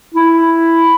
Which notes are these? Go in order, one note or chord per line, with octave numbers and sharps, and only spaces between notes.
E4